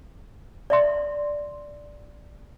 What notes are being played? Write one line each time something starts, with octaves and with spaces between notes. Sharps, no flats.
D5 E5 C6